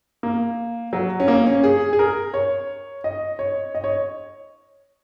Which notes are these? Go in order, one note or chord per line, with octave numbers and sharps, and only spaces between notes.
A#3
F#3
C#4
A#3
C#4
G#4
G#4
A#4
C#5
D#5
C#5
D#5
C#5